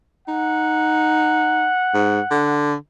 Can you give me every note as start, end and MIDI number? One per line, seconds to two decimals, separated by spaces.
0.28 1.69 63
0.28 2.57 78
1.94 2.20 44
2.31 2.75 50